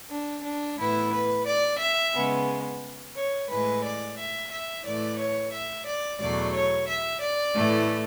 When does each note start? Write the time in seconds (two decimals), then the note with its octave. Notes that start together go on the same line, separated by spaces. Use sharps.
0.11 D4
0.45 D4
0.79 A2 E3 B3 E4
1.12 B4
1.47 D5
1.80 E5
2.14 C#3 G#3 B3
3.15 C#5
3.49 A2 E3 G#3 B4
3.84 D5
4.17 E5
4.51 E5
4.85 A2 E3 A3 D5
5.18 C#5
5.52 E5
5.86 D5
6.20 E2 B2 F#3 A3 D5
6.53 C#5
6.88 E5
7.22 D5
7.55 A2 E3 A3